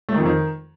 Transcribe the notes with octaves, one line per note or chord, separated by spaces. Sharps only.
A3
D#3
F2
D#3